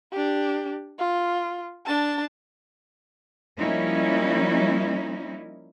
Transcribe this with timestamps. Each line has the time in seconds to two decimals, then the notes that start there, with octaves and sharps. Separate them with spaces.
0.12 D4 G4
0.99 F4
1.86 D4 A5
3.57 F3 G3 A#3 C#4 D#4 E4